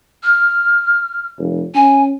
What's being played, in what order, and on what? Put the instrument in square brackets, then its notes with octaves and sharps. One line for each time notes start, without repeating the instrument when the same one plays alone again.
[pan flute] F6
[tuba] F1
[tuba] C#4 [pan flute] G#5